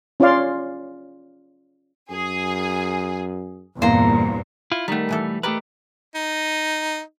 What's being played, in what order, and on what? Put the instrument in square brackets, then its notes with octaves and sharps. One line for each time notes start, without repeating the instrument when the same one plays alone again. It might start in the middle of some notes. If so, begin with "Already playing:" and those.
[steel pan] C#4 F4 C#5 D5 F5 C6
[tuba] F#2 [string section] G#4
[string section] E2 G2 A#2 [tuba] E3 [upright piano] A#3 [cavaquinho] C5 A#5
[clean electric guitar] E4 F4
[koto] D#3 B3 [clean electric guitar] G3 A3
[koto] B2 E3 A4
[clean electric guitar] A3 G4 B4 [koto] A#4 D5 D#5
[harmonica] D#4